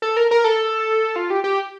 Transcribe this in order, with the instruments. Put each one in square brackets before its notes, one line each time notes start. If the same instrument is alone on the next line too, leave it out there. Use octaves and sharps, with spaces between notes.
[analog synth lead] A4
A#4
A#4
A4
F4
G4
G4